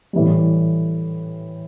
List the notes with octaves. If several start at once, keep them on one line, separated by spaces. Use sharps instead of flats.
A2 E3 G3